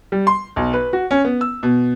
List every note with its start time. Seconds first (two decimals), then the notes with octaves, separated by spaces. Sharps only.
0.12 G3
0.27 C6
0.56 B1
0.73 B4
0.93 F#4
1.11 C#4
1.25 B3
1.41 E6
1.63 B2